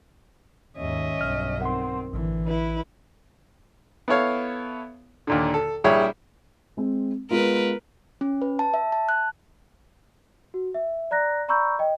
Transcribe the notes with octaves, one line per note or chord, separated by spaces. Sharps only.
D#2 G#2 C#4 D#5 E5
B1 G2 F6
D#3 C4 F#5 C6
A1 D3 E3
E4 B4
B3 E4 A4 C#5 F5
D#2 A#2 D3
A4
A#1 G3 E4 G#4 C#5
G#3 C4
G#3 B3 F4 A#4 B4
C#4
B4
A5
E5
A5
F#6
F#4
E5
D5 A#5 F#6 A#6
D5 A#5 B5 C#6 E6 G6
D#5 G5